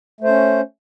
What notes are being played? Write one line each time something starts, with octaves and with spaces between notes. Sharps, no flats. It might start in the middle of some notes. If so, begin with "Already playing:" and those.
A3 C#4 C5